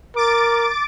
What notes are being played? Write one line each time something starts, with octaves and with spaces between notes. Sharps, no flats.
A#4 D6 A6 D7